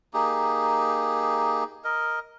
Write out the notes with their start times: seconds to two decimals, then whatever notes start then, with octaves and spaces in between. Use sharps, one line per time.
0.14 A#3 D#4 G4 G#4
1.84 A#4 D#5